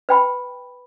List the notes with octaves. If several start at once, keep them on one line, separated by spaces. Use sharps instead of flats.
B4 G5 B5